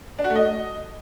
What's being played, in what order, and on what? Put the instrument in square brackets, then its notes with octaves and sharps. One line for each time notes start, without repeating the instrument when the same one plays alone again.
[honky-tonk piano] D4
F#4
A3
D#5